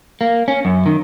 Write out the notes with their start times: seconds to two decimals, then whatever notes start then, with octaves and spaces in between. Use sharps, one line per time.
0.21 A#3
0.48 C#4
0.65 F#2
0.86 D#3